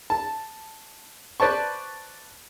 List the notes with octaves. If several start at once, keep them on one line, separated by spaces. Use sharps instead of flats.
A5
B4 C5 D5 A5 C#6